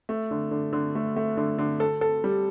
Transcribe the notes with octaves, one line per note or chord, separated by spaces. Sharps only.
A3
D3
D3
D3
A3
A3
D3
D3
A4
A4
G3